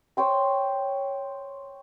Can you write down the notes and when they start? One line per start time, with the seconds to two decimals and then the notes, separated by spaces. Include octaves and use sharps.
0.17 C5 C#5 G5 C6